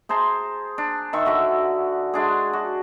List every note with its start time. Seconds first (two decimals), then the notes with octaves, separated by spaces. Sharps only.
0.09 G#4 C5 A5 A#5
0.78 D4
1.13 D#3 E5 C#6
1.26 D3 F#4 E5
2.14 G#3 D4 G#4
2.53 F#4